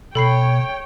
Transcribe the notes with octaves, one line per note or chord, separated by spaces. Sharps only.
B2 A4 C#5 G5 B5 C7